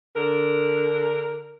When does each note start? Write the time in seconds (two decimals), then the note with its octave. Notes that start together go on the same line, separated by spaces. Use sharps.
0.16 D3 A#4